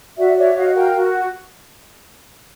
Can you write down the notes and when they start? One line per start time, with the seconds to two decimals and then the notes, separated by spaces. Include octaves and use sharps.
0.17 F#4 D5 E5
0.37 C#5 D5 E5
0.56 F#4 D#5 F5
0.75 A#4 F5 G5
0.95 F#4